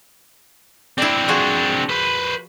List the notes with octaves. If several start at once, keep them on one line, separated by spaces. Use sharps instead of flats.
C4 D4 E4 D5
F3 F#4 G#4
B4 C5